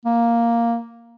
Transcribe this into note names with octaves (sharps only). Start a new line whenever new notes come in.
A#3